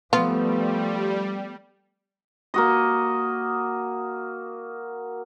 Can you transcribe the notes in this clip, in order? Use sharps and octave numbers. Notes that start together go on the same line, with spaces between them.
F3 G3 A3 B3 F4
A#3 F#4 D#5